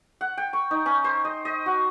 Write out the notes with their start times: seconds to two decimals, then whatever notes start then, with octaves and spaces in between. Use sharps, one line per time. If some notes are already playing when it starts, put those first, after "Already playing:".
0.21 F#5
0.38 G5
0.53 C#6
0.71 D#4
0.86 C#4
1.04 C5
1.25 D#5
1.45 D#5
1.66 F#4